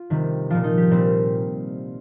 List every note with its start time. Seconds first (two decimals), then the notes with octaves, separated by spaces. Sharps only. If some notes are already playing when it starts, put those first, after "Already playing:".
Already playing: F4
0.10 C3 D#3 G3
0.50 A#2 F3 F4
0.64 D#4
0.78 G4
0.91 A#2 G3 C4